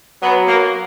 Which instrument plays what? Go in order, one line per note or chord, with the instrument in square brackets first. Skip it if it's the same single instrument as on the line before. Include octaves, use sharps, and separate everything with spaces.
[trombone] F#3 [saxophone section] B3
[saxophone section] A#3